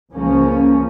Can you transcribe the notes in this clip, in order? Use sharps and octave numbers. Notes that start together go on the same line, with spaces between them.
C#2 C#3 F3 A#3 C#4